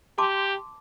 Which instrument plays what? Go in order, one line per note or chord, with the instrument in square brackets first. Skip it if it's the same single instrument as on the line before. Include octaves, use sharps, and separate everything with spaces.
[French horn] G4 [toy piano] A5 C6 D6